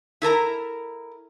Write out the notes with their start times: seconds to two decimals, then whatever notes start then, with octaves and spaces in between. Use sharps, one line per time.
0.22 E4 A4 A#4 A#5